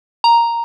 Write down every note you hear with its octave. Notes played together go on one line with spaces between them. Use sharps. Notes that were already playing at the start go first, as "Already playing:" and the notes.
A#5